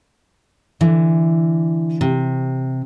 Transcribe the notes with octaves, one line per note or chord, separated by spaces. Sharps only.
D3 E3
C3